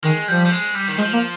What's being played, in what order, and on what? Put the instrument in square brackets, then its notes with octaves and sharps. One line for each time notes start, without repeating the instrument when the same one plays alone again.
[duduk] D#3 [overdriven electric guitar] G#3
[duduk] F3 [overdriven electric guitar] G3
[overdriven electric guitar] G3
G#3
G3
D#3
[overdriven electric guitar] F3 [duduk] G#3
[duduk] A#3